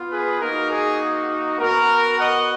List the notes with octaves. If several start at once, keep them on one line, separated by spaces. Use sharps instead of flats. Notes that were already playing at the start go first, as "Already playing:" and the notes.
Already playing: B3 F4
G#4 B4
A#3 D#4 F#4 A#4
G#4
B3 F#4 A#4
D#5 F#5